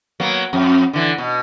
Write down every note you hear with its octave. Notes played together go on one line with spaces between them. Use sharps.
F#3 A#3 B3
F2
D3 E3
B2